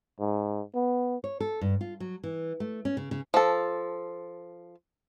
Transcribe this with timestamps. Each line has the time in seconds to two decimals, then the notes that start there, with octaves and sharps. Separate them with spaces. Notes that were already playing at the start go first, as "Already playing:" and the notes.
0.19 G#2
0.75 B3
1.24 C#5
1.40 A4
1.61 G2
1.81 F4
2.00 F#3
2.24 E3
2.60 A3
2.85 C#4
2.97 C#3
3.11 C#3
3.34 F3 A4